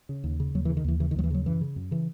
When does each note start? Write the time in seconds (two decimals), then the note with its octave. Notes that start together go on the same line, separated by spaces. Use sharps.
0.09 C#3
0.24 D#2
0.40 C#3
0.55 D#2 F#3
0.65 E3
0.70 C#3
0.77 D#3
0.84 D#2 E3
1.00 C#3 E3
1.11 D#3
1.16 D#2 F#3
1.24 E3
1.30 C#3 F#3
1.46 F#2 E3
1.61 C#3
1.76 F#2
1.91 C#3 E3